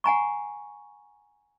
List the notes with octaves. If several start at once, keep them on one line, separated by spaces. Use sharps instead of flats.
F#5 G#5 A#5 C#6